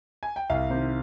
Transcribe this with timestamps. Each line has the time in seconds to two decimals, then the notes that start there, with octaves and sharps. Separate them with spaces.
0.23 G#5
0.36 G5
0.49 C2 F5
0.70 C3 D#3 C5